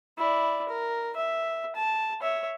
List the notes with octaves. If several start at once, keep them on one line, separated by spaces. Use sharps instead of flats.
E4 D5
A#4
E5
A5
C#5 E5